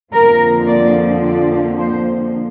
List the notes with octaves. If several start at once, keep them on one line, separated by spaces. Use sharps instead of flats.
F2 D3 F3 A#3 A#4
D5
D5
C5